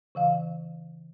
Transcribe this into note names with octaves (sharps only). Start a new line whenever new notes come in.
C#3 E3 F5